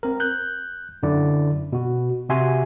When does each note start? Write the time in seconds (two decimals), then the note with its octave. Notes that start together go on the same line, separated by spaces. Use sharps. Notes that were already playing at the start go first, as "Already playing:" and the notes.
0.03 C4 A#4
0.20 F#6 G6
1.03 F#2 D3 E4 D5
1.73 B2 F#4
2.29 C3 F#4 E5 G#5 C6